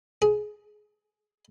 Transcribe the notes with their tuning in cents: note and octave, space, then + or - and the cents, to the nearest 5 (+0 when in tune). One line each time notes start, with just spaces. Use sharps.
G#4 +15